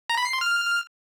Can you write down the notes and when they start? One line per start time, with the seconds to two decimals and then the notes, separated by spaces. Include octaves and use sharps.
0.10 A#5
0.17 B5
0.25 C7
0.33 C6
0.41 F6